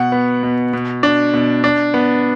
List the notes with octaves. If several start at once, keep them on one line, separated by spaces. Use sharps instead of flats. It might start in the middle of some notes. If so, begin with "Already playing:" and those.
Already playing: B2 F#5
B3
B2
B2
D4
B2
D4
B3